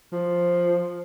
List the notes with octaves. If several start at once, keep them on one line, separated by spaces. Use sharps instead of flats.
F3